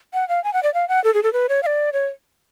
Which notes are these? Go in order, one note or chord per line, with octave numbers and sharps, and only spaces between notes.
F#5
F5
G#5
F#5
D5
F5
F#5
A4
G#4
A4
B4
C#5
F5
D5
C#5